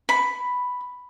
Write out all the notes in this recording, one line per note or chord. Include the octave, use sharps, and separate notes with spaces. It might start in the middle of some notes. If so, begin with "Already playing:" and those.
B5